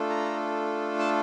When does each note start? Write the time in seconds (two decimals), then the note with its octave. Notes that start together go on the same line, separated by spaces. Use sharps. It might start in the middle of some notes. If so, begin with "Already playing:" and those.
Already playing: A3 D4 F4 A4
0.10 A#5
0.99 A5